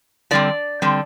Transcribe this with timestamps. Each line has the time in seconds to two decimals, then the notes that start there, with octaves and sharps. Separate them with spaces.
0.31 D3 G3 C4 D5
0.82 D3 G3 C4